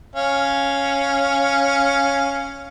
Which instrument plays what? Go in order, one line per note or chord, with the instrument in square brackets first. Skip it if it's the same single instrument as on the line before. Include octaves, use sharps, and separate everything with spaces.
[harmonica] C#4 F5